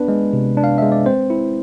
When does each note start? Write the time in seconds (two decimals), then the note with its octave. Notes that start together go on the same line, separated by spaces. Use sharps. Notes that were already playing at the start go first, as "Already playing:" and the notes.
Already playing: B3 D4 B4
0.08 G#3
0.33 C3
0.57 D4
0.64 F5
0.78 G#3 E5
0.92 D5
1.06 C4 C5
1.30 E4